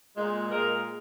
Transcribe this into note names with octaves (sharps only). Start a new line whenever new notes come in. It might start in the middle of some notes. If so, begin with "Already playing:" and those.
A#2 G#3
A#2 G#3 A#4